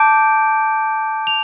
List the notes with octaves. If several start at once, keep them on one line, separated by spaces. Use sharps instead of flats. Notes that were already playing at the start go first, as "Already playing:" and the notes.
Already playing: A5 D6 G6 D7
F7